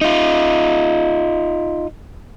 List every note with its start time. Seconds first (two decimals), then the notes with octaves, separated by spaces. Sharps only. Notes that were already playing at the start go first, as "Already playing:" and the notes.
0.01 D#4 F4